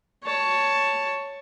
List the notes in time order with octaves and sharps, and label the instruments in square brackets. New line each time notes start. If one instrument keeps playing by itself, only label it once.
[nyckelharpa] C#5 A5